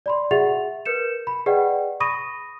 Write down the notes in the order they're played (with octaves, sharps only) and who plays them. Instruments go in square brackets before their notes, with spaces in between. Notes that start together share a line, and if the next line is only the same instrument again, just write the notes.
[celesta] D5 B5 C6
F#4 G#4 E5 F#5 A6 F7
A#4 B4 G6 C#7 E7
B5
G#4 B4 D5 D#5 F#5 G5
B5 C#6 D#6 A#6 D#7